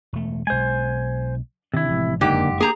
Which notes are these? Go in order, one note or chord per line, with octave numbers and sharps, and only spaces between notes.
E1 A3
B1 G#3 C5 G#5
C3 D#3 D4 E4
A1 F3 G#3
F#1 F2 G#2 D3 A#3 G4
A#3 G4 G#4 A#5